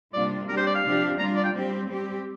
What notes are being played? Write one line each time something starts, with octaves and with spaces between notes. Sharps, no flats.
C3 G3 A#3 D4 F4 D5
G3 D4 G4 A#4
C5
D5
F5
C3 F3 D4 G4
G3 D4 F4 A#5
D5
G5
G3 C4 G4
G3 C4 G4